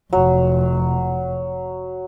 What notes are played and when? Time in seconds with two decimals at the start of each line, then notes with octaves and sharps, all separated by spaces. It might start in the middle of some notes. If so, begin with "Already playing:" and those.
0.13 F1 F#3